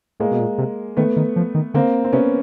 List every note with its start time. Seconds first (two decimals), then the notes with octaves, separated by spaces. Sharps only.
0.20 A2 G#3 A#3
0.31 B2
0.40 A#2
0.58 C3
0.97 D#3 A3 B3
1.17 D#3
1.36 F3
1.55 D#3
1.74 D3 A#3 C4
2.04 C4
2.13 C3 B3 C#4